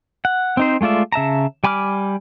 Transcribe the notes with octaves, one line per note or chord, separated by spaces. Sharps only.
F#5
C4 D#4 C5
G#3 A3 F4 D5 E5
C#3 E5 A5 A#5
G3 G#5 B5 D6 F6